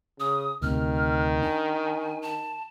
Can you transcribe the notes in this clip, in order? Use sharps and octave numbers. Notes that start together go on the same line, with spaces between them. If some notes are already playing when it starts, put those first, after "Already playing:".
C#3 D#6
D2 C3 D#3 F6
D4 G#5
A5